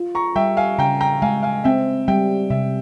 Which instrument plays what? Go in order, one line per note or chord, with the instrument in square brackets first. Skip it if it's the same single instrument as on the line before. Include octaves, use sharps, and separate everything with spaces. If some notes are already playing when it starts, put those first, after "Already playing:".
Already playing: [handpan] F4
[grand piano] A#5 C#6
[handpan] G3 [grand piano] E5 G5
[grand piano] F5 G#5
[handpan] C#3 [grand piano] G5 A#5
[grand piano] G5 A#5
[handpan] G#3 [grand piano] F5 G#5
[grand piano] F5 G#5
[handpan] C4 [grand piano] E5 G5
[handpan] G3 [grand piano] E5 G5
[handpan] C3 [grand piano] E5